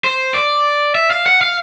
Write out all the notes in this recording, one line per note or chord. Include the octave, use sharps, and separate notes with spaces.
C5
D5
E5
F5
F#5
F5